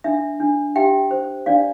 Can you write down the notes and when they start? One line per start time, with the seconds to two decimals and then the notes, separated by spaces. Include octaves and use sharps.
0.04 D4 E5
0.40 D4
0.76 G4 E5 G5
1.11 C5
1.46 D4 D5 F5